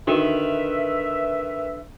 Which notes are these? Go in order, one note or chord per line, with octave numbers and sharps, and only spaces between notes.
D3 D#3 D#4 F#4 B4 D#5 E5